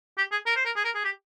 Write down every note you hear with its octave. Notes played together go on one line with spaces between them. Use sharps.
G4
G#4
A#4
C5
A#4
G#4
A#4
G#4
G4